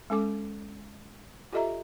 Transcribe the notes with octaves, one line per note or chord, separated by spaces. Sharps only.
G#3 C#4 A4 D6
F4 G4 A4 D#5 E5 A#5